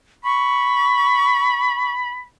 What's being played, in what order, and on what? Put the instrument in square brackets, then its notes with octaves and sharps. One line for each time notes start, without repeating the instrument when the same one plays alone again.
[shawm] B5 [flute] C#6